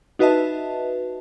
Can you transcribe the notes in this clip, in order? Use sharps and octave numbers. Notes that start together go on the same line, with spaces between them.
D#4 F#4 B4 D#5 E5 A5